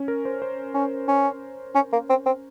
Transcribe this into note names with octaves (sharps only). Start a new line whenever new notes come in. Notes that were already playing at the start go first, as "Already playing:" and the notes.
Already playing: C#4
A#4
C5
C5
C#4
C#4
C#4
A#3
C4
C4